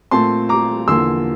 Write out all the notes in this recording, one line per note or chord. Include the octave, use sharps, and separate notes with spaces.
A#2 A3 C4 A5 C6
A#5 D6
E2 D3 F3 A#3 C6 E6